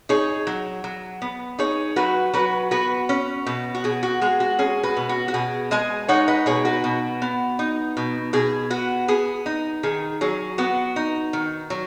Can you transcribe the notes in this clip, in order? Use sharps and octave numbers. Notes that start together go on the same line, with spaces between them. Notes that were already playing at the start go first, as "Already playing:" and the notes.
D#4 G#4 C#5
F#3
F#3
B3
D#4 G#4 C#5
F#3 F#4 B4
F#3 F#4 B4
B3 F#4 B4
C#4
B2
F#4
B2 G#4
F#4
G#3 G#4
F#4
C#4 G#4
F#4 B4
B2
F#4
F#4
B2 G#4
G#3 D#5 G#5
D#4 C#5 F#5
B4 D#5
B2 G#4 C#5
F#4 B4
B2
B3
D#4
B2
B2 G#4
B3 F#4
B3 G#4
D#4
D#3 G#4
F#3 G#4
B3 F#4
D#4
D#3
F#3